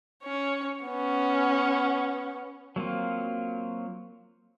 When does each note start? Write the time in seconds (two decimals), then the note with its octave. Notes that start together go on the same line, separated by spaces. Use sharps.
0.24 C#4 C#5
0.85 B3 C#4
2.76 F#3 A#3 C4 F4